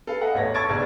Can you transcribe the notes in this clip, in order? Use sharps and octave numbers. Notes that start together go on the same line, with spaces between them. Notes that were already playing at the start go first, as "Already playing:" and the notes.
A4 B4 F5
D#5 E5 F#5
A1 E2 C#5 A#6
A5 C#6 E6 G#6 A6 D7
F#1 B1 D5